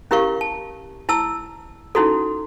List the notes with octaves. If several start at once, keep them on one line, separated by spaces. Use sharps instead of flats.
C#4 E4 G4 A#4 F5 C#6
A5
E4 A5 E6
C#4 D#4 E4 F#4 A4